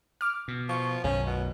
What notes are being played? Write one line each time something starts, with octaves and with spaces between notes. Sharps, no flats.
D6 F6
B2
F3 C#6
B1 F#2 D#3 C#4
B2